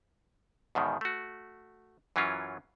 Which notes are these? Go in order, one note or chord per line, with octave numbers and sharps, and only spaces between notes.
E2 G#2 B2 D#3
A3 F#4
F#2 E3 F#3 C#4 F4